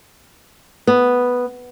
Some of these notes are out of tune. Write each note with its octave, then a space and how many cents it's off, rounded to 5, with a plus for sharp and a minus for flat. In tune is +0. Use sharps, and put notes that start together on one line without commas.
B3 +0